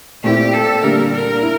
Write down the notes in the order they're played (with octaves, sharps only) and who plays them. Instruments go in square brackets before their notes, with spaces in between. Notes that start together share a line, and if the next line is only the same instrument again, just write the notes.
[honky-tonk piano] A#2 A3 C4 E4 [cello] G4
[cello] A4
[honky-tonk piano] D3 G3 A#3 [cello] A#4
[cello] A#4
[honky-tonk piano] E4